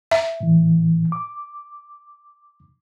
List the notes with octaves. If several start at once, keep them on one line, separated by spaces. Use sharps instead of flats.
E5
A2 E3
D6